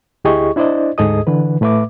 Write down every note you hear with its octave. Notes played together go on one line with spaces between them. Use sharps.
D2 E4 G4 G#4 D#5 C#6
D4 E4 C5 D5 D#5
D2 G#2 G#4 A4 D#5 D#6
D3 E3 B4
A2 A3 B4 E5 D6